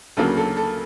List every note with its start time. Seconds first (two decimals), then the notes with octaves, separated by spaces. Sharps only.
0.17 D2 C#3 F#3 A#3 A4
0.37 A4
0.57 A4